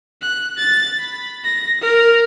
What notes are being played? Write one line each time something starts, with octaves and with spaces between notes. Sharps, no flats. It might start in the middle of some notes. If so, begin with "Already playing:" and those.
F#6
A6
B5
A#6
A#4